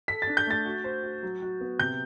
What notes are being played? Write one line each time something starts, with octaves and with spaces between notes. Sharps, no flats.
A4 B6
A6
D4
G6
A3 A6
F#4
C5
F#4
F#3
F#4
B3
C3 G6